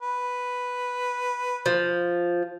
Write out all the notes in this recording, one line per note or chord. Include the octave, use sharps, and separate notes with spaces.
B4
F3